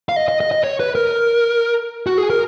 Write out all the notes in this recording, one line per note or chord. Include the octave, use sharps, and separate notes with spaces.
F5
D#5
D#5
D#5
D#5
C#5
B4
A#4
F#4
G#4
A#4